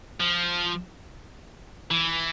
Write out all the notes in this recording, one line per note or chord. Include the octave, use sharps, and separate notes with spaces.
F3
E3